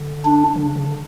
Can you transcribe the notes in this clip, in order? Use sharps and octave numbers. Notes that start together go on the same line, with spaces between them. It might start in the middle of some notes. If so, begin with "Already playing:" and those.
Already playing: D3
D4
D3
C#3
C#3
D3